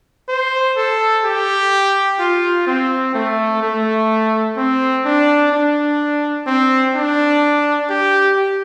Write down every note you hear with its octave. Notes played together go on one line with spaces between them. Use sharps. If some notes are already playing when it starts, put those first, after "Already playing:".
C5
A4
G4
F4
C4
A3
A3
C4
D4
D4
C4
D4
G4